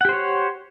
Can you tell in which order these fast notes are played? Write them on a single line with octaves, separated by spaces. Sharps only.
F#5 G4 C5 C#5